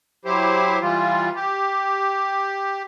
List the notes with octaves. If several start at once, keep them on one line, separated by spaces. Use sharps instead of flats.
F#3 E4 G4 C5
E3 G3 F4
G4